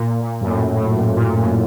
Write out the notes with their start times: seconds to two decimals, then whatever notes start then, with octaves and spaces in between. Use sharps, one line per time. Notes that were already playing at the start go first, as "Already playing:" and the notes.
Already playing: A#2
0.21 A#2
0.41 F#2
0.47 A2
0.76 A2
0.96 A#2
1.17 A#2
1.38 F#2